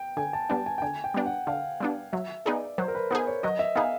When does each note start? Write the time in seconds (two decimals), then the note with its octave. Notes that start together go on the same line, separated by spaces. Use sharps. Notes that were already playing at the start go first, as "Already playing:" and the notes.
Already playing: G5
0.17 D3 G#5
0.33 A5
0.50 G3 B3 D4 A5
0.66 G#5
0.78 G5
0.82 D3 G#5
1.04 G5
1.14 G3 B3 D4
1.26 F#5
1.47 D3 F5
1.80 G3 B3 D4
2.13 F#3 E5
2.45 B3 D#4 G#4 D5
2.78 F#3 C5
2.88 A#4
2.95 B4
3.11 B3 D#4 G#4 C5
3.27 C#5
3.43 F#3 D#5
3.59 E5
3.76 B3 D#4 G#4 F5